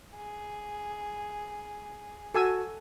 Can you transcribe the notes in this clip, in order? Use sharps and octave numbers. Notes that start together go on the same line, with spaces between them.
G#4
F#4 A4 G#5 E6